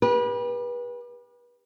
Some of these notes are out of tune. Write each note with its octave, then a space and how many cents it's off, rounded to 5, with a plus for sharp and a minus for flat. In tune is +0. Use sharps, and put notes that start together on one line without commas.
G4 +35 B4 -30